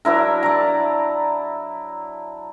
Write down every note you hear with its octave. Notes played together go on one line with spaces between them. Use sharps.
F#3 D4 E4 A#4
D5 A5 A#5